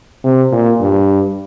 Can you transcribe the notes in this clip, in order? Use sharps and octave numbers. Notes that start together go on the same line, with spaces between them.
C3
A#2
G2